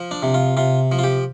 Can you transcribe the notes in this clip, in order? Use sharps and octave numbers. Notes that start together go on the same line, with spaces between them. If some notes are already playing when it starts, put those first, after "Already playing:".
Already playing: F3
D4
C3
F4
C3 F4
F3
F4
G4